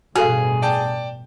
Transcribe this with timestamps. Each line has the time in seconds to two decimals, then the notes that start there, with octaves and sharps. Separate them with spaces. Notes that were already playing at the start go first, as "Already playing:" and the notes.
0.16 A1 G2 B2 F#4 G#4 A4 F5
0.62 D5 G5 A5